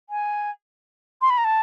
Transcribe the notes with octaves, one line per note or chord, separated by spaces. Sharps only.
G#5
C6
B5
A#5
A5